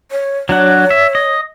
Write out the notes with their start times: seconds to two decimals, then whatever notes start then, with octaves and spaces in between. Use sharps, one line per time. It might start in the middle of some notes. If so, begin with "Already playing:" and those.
0.11 C#5
0.49 F#3 D4 C#5 F#5
0.90 E5
1.15 D#5